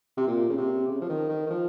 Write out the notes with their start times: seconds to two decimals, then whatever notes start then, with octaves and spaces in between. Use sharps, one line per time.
0.17 C3
0.27 A#2
0.49 C#3
0.57 C3
0.88 C#3
1.01 F3
1.09 D#3
1.29 D#3
1.46 D#3
1.50 F3